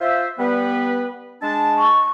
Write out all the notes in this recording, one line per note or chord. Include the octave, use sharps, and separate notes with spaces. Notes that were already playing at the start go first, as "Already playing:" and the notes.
F4 C5 E5
G3 B3 B4
G#3 D4 A5
C#6